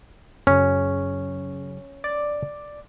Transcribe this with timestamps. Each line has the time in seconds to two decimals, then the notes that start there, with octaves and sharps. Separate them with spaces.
0.47 F#2 C#3 C#4
2.04 D5